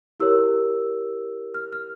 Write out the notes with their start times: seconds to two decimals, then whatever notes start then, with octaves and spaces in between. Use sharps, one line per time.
0.20 E4 G4 A#4 C#5 E6
1.54 F6
1.73 F6